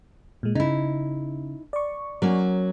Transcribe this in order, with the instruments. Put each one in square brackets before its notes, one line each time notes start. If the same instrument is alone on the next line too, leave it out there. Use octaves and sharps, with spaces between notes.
[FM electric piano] A#2 G#3
[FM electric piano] C#3 [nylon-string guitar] D#4 E4
[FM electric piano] D5 C#6
[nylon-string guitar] F#3 A#3 C#4